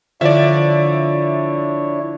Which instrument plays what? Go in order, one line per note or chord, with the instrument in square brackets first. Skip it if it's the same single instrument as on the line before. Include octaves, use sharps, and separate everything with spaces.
[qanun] D3 F3 [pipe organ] D4 E4 C#5 [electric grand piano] D5 E5